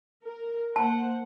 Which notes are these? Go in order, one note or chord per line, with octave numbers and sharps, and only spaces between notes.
A#4
A#3 C5 F#5 A5